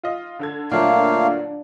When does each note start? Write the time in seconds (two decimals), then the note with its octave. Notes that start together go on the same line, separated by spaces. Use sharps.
0.03 F4 D#5
0.39 D3 A4 G#6
0.71 A#2 D3 F#3 A3 A#3 D4 F5